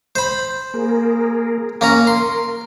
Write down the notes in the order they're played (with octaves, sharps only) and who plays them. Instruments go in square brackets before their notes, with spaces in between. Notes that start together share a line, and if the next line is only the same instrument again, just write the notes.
[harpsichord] C5 B5
[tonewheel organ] A#3 G#4 A#4
[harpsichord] A#3 C#4 A#5 [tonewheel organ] A#4
[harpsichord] C6